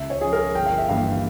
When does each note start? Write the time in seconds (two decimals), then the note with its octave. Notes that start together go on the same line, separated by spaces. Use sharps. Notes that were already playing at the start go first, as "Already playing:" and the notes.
Already playing: C#2 E5
0.10 C#5
0.21 C#3 F3 G#4
0.33 A#4
0.55 G1 G5
0.66 F5
0.78 E5
0.89 G2 E3 A#3 F5